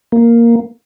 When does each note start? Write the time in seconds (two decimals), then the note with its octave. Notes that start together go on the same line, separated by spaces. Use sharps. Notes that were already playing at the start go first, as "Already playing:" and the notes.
0.12 A#3